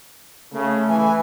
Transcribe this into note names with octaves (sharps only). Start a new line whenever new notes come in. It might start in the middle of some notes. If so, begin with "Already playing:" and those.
C#3 A3
E3 G#5